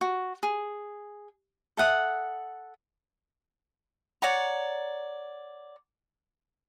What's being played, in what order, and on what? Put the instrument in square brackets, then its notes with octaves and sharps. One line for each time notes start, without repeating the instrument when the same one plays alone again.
[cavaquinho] F#4
G#4
A4 E5 F#5 D#6
C#5 D5 F#5 A#5